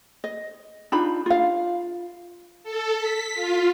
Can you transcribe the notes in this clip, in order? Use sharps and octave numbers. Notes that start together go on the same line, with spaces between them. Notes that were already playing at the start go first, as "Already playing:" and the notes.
D#5
D4 D#4 F4 B5
F4 F5
A4
B6
F4